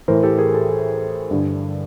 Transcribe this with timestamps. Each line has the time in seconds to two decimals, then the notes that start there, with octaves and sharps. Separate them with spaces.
0.08 A2 E3 A#4 C5
0.23 G4 A4
0.39 G#4 A#4
0.54 G4 A4
0.69 G4
1.31 G2 D3